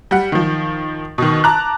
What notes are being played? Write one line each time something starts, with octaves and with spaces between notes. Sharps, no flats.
G3 F#5
D#3 F3
B2 D#3
A5 A#5 D6 F#6